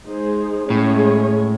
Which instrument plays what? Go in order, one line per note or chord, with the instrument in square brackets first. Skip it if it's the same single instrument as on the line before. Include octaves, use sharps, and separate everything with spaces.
[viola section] G#3 D#4 G#4 C5
[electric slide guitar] A2 [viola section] G#3 C#4 G#4 C#5